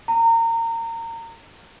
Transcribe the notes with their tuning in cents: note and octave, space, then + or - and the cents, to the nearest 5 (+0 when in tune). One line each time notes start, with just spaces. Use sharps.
A#5 -25